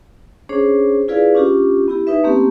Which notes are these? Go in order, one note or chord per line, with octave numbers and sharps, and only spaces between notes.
C#4 D4 G#4 C5 C#5
E4 F4 G#4 B4 D5 F5
C#4 D4 F4 G4
B3 E4 G4
D#4 B4 E5
A3 A#3 C4 C#4 G4